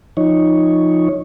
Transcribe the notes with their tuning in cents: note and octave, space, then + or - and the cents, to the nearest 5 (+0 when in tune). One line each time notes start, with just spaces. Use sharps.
F3 +0 D#4 +0 C#5 +0